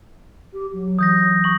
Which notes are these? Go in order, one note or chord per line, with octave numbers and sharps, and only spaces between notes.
G4
F#3
E3 D#6 G6 A#6
C#6 F#7